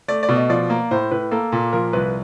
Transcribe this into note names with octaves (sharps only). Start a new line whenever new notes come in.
A3 D5
D5
B2
D#5
F3 D5
A#3
A2 C5
A2 B4
A#3 A4
A#2
F3 A#4
C2 B4